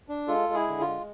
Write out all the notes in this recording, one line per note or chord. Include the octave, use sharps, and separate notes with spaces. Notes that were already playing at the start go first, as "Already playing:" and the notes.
D4
G#3 F4 A4
G#3
E4 G#4
D3
F4
G#3